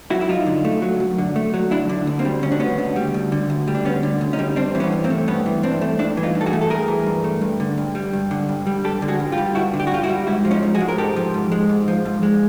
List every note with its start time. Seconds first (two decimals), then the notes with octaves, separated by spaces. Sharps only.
0.10 F#3 E4 F#4
0.21 E4
0.29 F#2 D#4 F4
0.46 D3
0.65 A3
0.82 F#3
1.00 F#2
1.18 D3
1.36 A3
1.54 F#3
1.71 D2 D4 E4
1.89 D3
2.07 D2
2.19 A#3 C4
2.25 G3
2.43 D2 C#4
2.52 D4
2.60 D3 B3 C#4
2.78 D2
2.96 G3
3.14 D2
3.32 D3
3.50 D2
3.68 G3
3.75 D4
3.85 D2 B3 C#4
4.03 D3
4.21 D2
4.33 C#4 D#4
4.39 G3
4.56 G2 C4 D4
4.75 E3 C4
4.80 B3 C#4
4.92 G2
5.04 A#3 C4
5.10 A3
5.28 G2 B3 C#4
5.46 E3
5.63 G2 C4 D4
5.81 A3
5.99 G2 D4 E4
6.17 E3
6.23 D#4 F4
6.35 G2
6.41 A4
6.46 F#4 G#4
6.53 A3
6.61 A4
6.70 G2 G#4 A#4
6.88 E3
7.06 G2
7.24 A3
7.41 G2
7.60 D3
7.78 G2
7.95 G3
8.13 G2
8.31 D3
8.49 G2
8.67 G3
8.84 G2 G4 A4
9.02 D3
9.08 F#4 G#4
9.20 G2
9.32 F4 G4
9.38 G3
9.55 G2 E4 F#4
9.73 D3
9.80 G4
9.87 F#4
9.92 G2 F4 G4
10.03 E4 F#4
10.09 G3
10.27 G#2 E4 F#4
10.45 F3
10.51 C#4 D#4
10.63 G#2
10.75 F#4 G#4
10.80 G#3
10.88 A#4
10.98 G#2 G4 A4
11.16 F3
11.34 G#2
11.52 G#3
11.69 G#2
11.88 F3
12.05 G#2
12.23 G#3